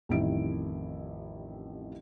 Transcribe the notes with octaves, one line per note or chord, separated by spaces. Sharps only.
A1 F2 D#3 G3 E4 D7